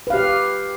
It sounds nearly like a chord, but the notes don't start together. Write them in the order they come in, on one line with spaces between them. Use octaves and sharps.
B4 F5 G4